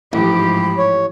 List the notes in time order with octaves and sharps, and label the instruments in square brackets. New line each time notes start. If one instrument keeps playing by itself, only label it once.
[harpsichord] A1 [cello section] G#2 F3 G4 [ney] B5
[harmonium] C#5